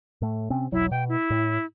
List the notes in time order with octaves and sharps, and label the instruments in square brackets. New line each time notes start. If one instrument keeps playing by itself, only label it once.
[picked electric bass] A2 A3
C3 C4 C#4
[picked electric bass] E1 B1 F#3 [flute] E4
[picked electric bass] B2 [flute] G5
[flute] E4
[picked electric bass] A2